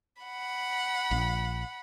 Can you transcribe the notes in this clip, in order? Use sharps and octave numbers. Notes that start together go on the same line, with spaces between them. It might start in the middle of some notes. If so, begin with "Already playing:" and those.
F#5 B5
A#1